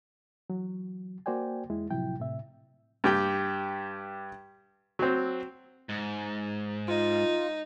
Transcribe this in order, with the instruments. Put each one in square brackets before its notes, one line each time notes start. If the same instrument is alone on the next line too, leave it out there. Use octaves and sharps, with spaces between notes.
[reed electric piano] E3 F#3
A#3 F#4 C5 D5 G5 G#5
E2 G#3 E4
A2 C3 F3 F#3 E4 G5
A2 C3 E5
[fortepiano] G2 G4 G5
F#3 C4
[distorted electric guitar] G#2
[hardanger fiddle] D#4 [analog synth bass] F4